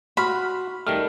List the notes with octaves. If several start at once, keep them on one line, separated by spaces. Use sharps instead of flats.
F#4 B5 C6 F6
D#3 G3 A3 F6